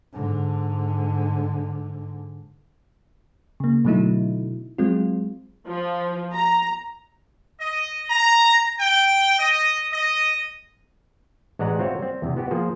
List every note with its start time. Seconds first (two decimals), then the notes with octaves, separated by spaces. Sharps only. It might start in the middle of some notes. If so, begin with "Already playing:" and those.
0.13 G#2 D3
3.60 C#3 A#3
3.85 B2 D3 F#3 A3 D#4 E4
4.78 F#3 G#3 C4 F4
5.67 F3
6.34 A#5
7.60 D#5
8.10 A#5
8.80 G5
9.39 D#5
9.92 D#5
11.59 A1 G#3 D5 F#5 A#5
11.79 C4 F4 F#4 C#5 E5
11.99 G3 C4
12.22 E2 C3
12.37 B3 F#4 G4
12.51 F3 A#3 G#4 C5